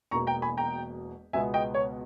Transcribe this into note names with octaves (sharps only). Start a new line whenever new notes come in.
E1 E2 B2 A#3 A#5 C#6
G5 A#5
G#5 B5
G5 A#5
C#2 B2 G#3 B3 E5 G#5
D#5 G5
C#5